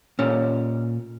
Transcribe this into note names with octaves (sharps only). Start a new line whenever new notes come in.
A#2 C#4